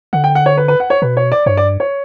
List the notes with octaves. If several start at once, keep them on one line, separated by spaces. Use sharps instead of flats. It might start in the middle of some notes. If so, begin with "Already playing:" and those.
D3 F#5
G5
F#5
C#5
B4
B4
F#5
C#5
B2 B4
C#5
D5
G2 C#5
D5
C#5